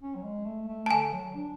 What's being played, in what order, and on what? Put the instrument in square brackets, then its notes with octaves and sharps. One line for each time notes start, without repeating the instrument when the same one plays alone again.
[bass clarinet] C#4
F#3
G#3
A3
A3
[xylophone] A5
[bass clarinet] D3 [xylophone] G#5
[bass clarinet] F#3
D4